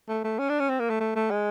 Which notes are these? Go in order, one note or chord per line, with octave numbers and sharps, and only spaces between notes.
A3
A3
C#4
D4
C#4
C4
A#3
A3
A3
A3
G#3